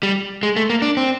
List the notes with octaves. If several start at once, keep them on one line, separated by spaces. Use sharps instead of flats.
G3
G#3
A3
A#3
D4
C4